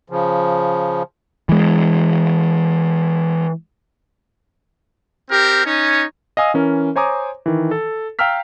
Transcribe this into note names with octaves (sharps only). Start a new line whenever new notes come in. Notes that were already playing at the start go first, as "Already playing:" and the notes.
C#3 F3
E3 G#3
C4 G4 A#4
C#4 D#4 C#5
D#5 F5 G#5 D#6 E6
E3 C#4 A#4
C5 C#5 G#5 A#5 D6 D#6
D#3 E3
A4
F5 G5 A#5 E6 F6 B6